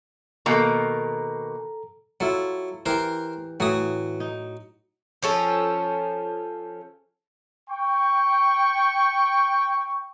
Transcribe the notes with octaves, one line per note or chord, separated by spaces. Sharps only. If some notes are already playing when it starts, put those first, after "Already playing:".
B2 D#3 A#3 A4 A#5
F#3 E4 F4 A4
E3 G4 A#4 C5
A2 E3 F#3 D#6
D#4
F3 C#4 A4
G5 C#6